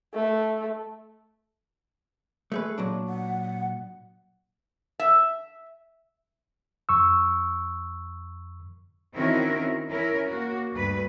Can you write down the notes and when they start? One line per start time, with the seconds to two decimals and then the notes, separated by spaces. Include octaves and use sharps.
0.14 A3
2.52 A3 G#4 B4
2.78 A#2 F#3 D4
3.09 F#5
4.99 E5
6.89 F2 C#6 E6
9.15 D#3 C4 C#4 E4 F#4 A#4
9.90 C#4 E4 A#4
10.27 A#3 F#4
10.72 D2 G2 B4